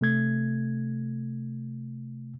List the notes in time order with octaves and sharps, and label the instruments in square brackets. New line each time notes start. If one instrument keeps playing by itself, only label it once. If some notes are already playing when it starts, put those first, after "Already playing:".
[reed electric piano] C3 A3 G#6